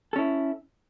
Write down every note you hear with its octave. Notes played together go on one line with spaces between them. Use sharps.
C#4 E4 A4